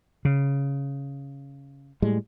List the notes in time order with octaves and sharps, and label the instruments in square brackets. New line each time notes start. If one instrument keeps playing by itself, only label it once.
[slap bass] C#3
[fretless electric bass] A2 G3 G#3